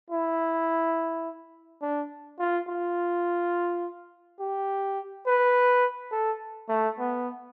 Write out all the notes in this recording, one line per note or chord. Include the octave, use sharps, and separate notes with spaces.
E4
D4
F4
F4
G4
B4
A4
A3
B3